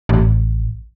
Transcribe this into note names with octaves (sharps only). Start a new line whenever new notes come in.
A1